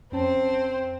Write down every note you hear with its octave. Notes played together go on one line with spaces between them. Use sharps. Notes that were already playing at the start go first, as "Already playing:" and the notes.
F2 C4 C#4 C5 A5